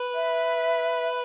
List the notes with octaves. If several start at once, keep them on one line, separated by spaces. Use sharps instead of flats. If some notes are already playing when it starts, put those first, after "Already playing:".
Already playing: B4
E5